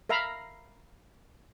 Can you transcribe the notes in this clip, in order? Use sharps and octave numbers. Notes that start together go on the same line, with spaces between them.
A#4 E5 F5 A#5 B5